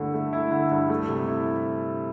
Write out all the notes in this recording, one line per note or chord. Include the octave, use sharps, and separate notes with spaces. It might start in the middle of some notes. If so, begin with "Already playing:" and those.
Already playing: G2 D3 A3 E4
A3
E4
D3
G2
A3
C3
E4